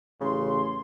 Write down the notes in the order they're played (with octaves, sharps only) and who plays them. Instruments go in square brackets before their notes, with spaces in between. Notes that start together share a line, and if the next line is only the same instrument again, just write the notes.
[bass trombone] A1 [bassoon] C#3 [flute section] C6